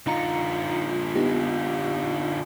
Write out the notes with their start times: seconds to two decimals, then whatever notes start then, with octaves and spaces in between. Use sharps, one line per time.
0.07 D3 D#4 F4 A#5 C#7
1.16 B3 D#4 G4